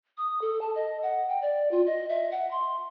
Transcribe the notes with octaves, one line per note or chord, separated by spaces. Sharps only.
D#6
A4
A5
D#5
F#5
G5
D5
F4
D#5
E5
F#5
C6